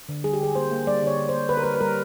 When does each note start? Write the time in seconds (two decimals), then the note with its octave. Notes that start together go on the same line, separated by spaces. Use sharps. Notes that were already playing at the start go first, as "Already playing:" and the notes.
0.09 D3
0.24 G3 G#4
0.34 G4
0.41 D3 G#4
0.55 A#3 C5
0.71 A#3
0.87 G3 D5
1.03 D3 C#5
1.19 D3
1.29 A#3 C5
1.49 D3 B4
1.57 A#4
1.64 G3 B4
1.75 B4
1.81 G3 A#4